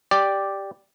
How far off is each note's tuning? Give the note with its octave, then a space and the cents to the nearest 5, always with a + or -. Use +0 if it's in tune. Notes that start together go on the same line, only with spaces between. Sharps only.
G4 +0 D5 +0